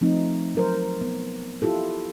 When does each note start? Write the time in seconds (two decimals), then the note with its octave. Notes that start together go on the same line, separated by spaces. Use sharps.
0.01 F3 A3 C4 D#4
0.55 F#3 A#4 C5
1.01 B3
1.62 E4 F4 G4 A4